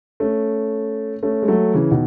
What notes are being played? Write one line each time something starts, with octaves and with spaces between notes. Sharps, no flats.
A3 C#4
A3 C#4
G#3
F#3 A3
C#3 E3
B2 D#3